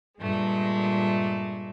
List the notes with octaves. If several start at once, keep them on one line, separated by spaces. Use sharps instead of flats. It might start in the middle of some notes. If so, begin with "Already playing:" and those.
G2 A#2 G#3 A3